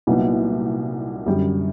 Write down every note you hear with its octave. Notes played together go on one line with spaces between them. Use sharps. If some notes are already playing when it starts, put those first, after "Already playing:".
C2 A#2 F#3 B3 D#4
F#2 D3 G3